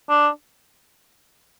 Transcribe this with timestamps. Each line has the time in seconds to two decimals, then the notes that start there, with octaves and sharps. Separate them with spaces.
0.09 D4